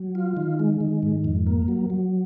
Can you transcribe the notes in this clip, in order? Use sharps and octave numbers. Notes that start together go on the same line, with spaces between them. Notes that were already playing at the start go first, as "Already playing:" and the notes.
Already playing: F#3
F4
D#3
G#3
D#3
G#2
F2
A#3
F#3
F#3